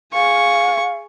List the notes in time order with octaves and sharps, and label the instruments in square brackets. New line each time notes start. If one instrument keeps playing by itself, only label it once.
[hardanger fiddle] G#4 C#6 [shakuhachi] F5